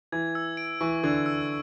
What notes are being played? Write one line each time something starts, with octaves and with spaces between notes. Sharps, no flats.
E3 G#6
E6
D7
E3 C#6
D3 G#6
E6